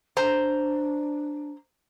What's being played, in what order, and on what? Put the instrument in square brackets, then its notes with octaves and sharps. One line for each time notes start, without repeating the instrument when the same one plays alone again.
[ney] D4 [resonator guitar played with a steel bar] C5 A#5